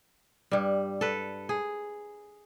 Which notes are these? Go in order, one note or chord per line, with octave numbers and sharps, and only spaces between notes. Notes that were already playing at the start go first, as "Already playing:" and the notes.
G2 G3
A4 B4
G#4